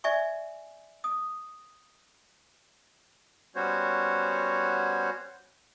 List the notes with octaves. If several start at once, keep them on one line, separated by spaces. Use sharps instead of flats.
D5 E5 G#5 C#6
D#6
G3 B3 C#4 F#4 C5 C#5